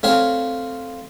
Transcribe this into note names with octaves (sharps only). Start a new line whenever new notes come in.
A3 C4 C#5 F5